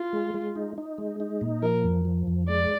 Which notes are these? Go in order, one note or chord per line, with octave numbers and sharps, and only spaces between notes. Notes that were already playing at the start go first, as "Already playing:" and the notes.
Already playing: F4
G#3
G#3
D#4
D#4
G#3
D#4
A#2
F3 A#4
F2
F3
F2
G#3 D5